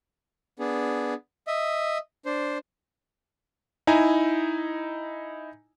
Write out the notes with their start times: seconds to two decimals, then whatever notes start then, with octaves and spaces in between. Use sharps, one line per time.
0.59 B3 D4 G#4
1.47 D#5 E5
2.26 D4 C5
3.87 D#4 E4 G#5 A#5